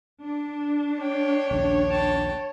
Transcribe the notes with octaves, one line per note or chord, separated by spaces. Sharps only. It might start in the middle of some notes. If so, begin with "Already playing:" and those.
D4
C#5 G5
A#1 D#2 C#3
G5 A5